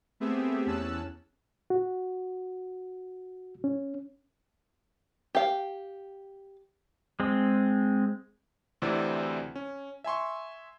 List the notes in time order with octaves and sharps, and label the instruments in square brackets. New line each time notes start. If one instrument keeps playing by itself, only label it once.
[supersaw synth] A3 B3 C4 G4 G#4 E5
E2 C#4 A5 E6 F#6
[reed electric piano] F#4
C#4
[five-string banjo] G4 F5
[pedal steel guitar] G#3 C4
[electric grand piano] D2 C3 E3 C4 E4 D5
C#4
E5 G#5 C6 C#6